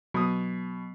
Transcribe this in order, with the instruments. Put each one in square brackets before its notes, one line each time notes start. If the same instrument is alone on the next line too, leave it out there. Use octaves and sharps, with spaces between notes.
[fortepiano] B2 D#6 [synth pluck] F#3 [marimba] B3